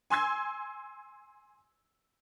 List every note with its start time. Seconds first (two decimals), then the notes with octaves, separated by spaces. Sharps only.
0.10 G#5 C6 E6 G#6